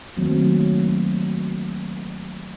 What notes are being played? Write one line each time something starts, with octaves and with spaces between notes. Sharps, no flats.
D#3 F#3 A3 A#3 C4